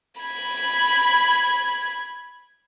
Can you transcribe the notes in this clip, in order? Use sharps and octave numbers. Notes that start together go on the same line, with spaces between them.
B5 G#6